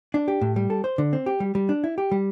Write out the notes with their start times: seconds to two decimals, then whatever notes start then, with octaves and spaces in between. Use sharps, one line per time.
0.14 D4
0.28 G4
0.41 A2
0.56 G3
0.70 A4
0.84 C5
0.98 D3
1.13 C4
1.26 G4
1.40 G3
1.55 G3
1.69 D4
1.84 E4
1.98 G4
2.12 G3